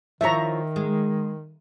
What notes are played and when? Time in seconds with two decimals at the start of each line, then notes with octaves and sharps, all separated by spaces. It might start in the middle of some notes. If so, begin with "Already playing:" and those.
0.21 D#3 F3 E4 C#5 E5 A#5
0.76 G#3